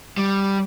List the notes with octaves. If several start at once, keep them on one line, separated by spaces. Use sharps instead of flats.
G3